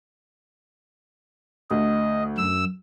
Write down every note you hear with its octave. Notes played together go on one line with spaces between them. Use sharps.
D2 D#5
F#2 E6